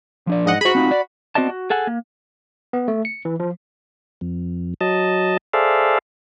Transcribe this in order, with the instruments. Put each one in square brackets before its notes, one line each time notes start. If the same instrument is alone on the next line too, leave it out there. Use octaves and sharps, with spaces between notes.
[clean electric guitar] F3 D4 D5
[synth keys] G#2 D#5 F#5
[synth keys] F#4 B5 [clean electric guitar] G#4 C5
[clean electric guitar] C4 D#4 F4
D5
[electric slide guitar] B3 C4 F#4 D5 D#5 A5
F#4
G#4 A4 F#5 G#5
A#3
[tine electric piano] B3
A3
C#7
E3
F3
[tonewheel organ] F2
F#3 D#5 A5
G#4 A4 C5 D5 E5 F5